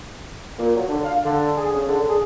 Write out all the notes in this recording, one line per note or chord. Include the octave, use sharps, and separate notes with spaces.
A#2
F#3
D3
F5
D3
G#4
C#3
D3
G#4